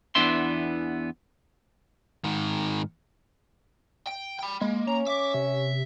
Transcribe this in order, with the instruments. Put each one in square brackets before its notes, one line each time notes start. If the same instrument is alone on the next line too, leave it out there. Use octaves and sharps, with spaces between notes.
[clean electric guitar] E2 E3 B3 D4 E5 C6
[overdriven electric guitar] G#2 D#3
G5
G5 B5
[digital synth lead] G#3 [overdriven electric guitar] A#3
[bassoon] C#4 [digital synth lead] A#5
[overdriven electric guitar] E5 [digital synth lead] D6
[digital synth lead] C3